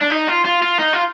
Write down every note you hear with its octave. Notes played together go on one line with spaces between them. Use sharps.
D4
D#4
F4
F4
F4
D#4
F4